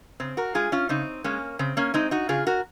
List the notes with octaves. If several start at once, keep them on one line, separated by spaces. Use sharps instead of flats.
C#3 C4
F#4 A#4
G#3 F4 G#4
C#4 F4
C#3 C4 D#4
G#3 A#3 C#4
C#3 C4
A#3 C#4
G#3 C4 D#4
D#4 F#4
C#3 F4 G#4
F#4 A#4